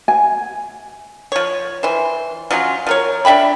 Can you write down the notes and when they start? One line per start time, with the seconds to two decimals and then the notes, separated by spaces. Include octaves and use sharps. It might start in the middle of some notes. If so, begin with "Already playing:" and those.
0.08 G#5
1.32 F3 C#5
1.83 E3 C5
2.51 F3 F#3 C#4 F4
2.87 F3 A#4 C#5
3.25 D4 E5 G5 B5